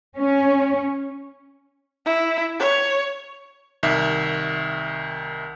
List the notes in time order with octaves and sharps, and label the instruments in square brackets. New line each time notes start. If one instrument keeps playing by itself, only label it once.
[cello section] C#4
[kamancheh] E4
C#5
[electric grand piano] C2 D#3 E5